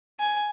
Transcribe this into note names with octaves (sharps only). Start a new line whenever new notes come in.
G#5